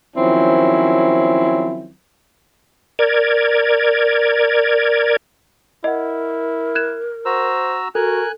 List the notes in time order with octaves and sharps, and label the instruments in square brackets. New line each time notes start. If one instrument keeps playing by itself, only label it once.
[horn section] D#3 F3 F#3 C4 C#4 E4
[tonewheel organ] A#4 D5 G#6
[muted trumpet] E4 [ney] A#4 [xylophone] D#5 F#5
[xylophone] F#6 G#6 E7
[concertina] F#4 A#5 E6 [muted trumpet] C5
[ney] F#4 [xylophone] A4 [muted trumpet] A#4 [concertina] G#5 F#6